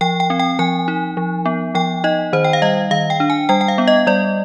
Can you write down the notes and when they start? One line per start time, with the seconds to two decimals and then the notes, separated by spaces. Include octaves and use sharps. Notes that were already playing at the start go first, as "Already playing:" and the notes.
0.01 F3 G5
0.20 G5
0.30 C4
0.39 G5
0.59 F3 G#5
0.88 D#4
1.17 F3
1.46 B3
1.75 F3 G5
2.04 D#4 D#5
2.33 D#3 C5
2.44 G5
2.53 F5
2.62 G3 D#5
2.91 D#3 F5
3.10 G5
3.20 D4
3.30 G#5
3.49 G3 G5
3.61 G5
3.68 F5
3.78 B3
3.88 D#5
4.07 G3 D5